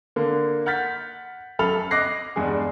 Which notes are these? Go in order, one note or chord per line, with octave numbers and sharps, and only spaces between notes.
D3 A#3
F#5 F6 G6 A6 B6
F#2 A4 B5 F6 F7
D#5 D6 F#6 A#6 C7
E2 G2 G#3 G#4